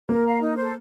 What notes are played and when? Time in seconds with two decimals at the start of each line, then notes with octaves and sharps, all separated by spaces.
0.09 A#3 A#4
0.24 F5 A#5
0.41 D#4
0.57 A4 C5